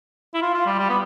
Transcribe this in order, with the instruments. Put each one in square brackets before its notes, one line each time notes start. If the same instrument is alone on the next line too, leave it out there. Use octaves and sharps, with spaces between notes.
[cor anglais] E4
F4
F4
G3
G3
B3